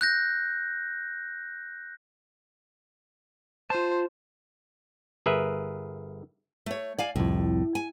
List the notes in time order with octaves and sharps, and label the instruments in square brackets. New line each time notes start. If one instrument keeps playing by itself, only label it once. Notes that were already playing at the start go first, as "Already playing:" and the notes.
[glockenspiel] F#6 G6 A#6
[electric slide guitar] F4 A5 [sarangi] C5
[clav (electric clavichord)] G1 G#4 A#4 B4 E5
[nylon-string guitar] A3 C#5
D5 F5 G#5
[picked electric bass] C2 F2 [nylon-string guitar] A2
[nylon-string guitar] G#5